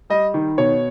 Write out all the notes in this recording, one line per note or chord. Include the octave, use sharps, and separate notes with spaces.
G3 D#5
D#3
B2 C#5